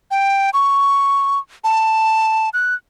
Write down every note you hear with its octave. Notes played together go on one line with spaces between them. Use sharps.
G5
C#6
A5
F#6